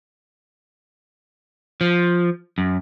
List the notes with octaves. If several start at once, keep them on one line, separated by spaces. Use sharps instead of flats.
F3
F#2